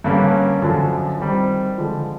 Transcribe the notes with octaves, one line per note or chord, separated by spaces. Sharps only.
G2 D3 G3 A#3 C#4
F#2 D3 F3
D#3 G3 C4
D3 F3 G#3